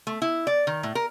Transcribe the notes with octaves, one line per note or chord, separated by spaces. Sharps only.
A3
E4
D5
D#3
A2
A#4